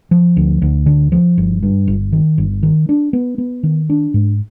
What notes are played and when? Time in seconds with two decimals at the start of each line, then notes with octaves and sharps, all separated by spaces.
0.11 F3
0.37 D2
0.62 D2
0.86 D3
1.12 F3
1.38 G1
1.63 G2
1.87 G1
2.12 D#3
2.38 G1
2.63 D#3
2.89 D4
3.13 B3
3.38 B3
3.63 D#3
3.90 D4
4.14 G#2